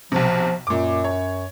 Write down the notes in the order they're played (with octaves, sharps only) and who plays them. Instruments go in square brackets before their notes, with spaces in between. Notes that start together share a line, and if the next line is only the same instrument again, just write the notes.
[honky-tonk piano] B1 C3 [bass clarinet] F3
[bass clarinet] F#2 [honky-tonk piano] A#2 D6
[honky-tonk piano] C#5